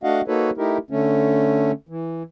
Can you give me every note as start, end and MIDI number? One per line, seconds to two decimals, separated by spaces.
0.03 0.21 57
0.03 0.21 62
0.03 0.21 66
0.03 0.21 75
0.03 0.21 77
0.03 0.21 78
0.28 0.50 58
0.28 0.50 63
0.28 0.50 66
0.28 0.50 69
0.28 0.50 71
0.28 0.50 73
0.57 0.78 57
0.57 0.78 63
0.57 0.78 64
0.57 0.78 67
0.57 0.78 70
0.90 1.72 50
0.90 1.72 57
0.90 1.72 61
1.89 2.23 52